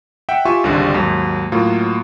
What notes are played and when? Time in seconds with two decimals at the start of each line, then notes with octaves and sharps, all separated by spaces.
0.29 E5 F#5 G5 E6
0.45 F4 G4 E5 G#5 C#6
0.64 G#1 C#2 G#2 D3 G3
0.94 D#2 G#2 F#3
1.52 A2 F#3 A#3 F4